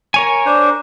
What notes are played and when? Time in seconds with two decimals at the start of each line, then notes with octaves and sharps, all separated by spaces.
0.14 A#4 C#5 G#5
0.46 D4 C5